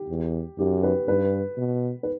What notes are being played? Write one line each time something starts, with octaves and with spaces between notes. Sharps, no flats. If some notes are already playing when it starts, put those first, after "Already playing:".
Already playing: G4
E2
F#2 G4
B4
G2 B4
B2
B4